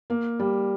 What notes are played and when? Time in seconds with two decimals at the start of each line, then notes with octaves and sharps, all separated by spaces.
0.10 A#3
0.39 G3